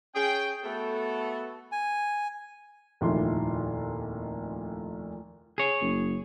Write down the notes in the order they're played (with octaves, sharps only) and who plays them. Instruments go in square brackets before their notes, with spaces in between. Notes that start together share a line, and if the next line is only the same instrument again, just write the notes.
[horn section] C#4 G#4 G5
A3 B3 F#4 A4
[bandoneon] G#5
[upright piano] F1 D#2 A#2 E4 F4 C6
[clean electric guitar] G#4 C#5
[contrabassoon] F#1